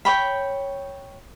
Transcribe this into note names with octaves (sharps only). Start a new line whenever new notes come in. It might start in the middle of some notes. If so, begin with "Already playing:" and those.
C#5 G5 B5